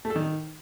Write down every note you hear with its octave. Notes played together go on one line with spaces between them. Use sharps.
A3
A4
D#3